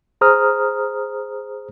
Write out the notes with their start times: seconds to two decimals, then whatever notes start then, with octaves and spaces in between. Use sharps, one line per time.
0.21 G#4 C5 A#5 D#6 F6